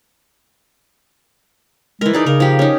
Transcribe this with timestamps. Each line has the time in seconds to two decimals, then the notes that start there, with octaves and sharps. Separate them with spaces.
2.01 E3 G#3 A#4
2.13 D#4 G#4 A#4 D5
2.26 C#3 A#4
2.40 F3 G4
2.59 C#4 D#4